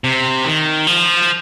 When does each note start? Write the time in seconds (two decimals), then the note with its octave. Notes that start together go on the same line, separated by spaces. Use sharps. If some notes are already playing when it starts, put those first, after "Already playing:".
0.04 C3
0.45 D#3
0.87 F3